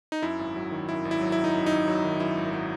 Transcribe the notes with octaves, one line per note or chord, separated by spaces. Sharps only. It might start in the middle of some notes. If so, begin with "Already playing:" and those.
D#4
F#2 E4
G#1
F#3
D#3
F#2 E4
G#1
E4
F#3
E4
D#3
D#4
F#2
G#1 D#4
F#3
D#3
F#2 E4
G#1
F#3